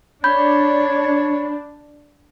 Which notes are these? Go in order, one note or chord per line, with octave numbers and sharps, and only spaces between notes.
D4 C#5 B5 G6